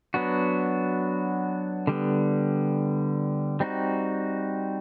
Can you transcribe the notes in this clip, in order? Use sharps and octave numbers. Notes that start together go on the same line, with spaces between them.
F#3 B3 D4 F#4
D3 G3 B3
G3 C4 D#4 F#4